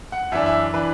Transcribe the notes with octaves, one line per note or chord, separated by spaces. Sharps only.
F#5
F#2 E3 D4 E5
E5
E3 D4 B4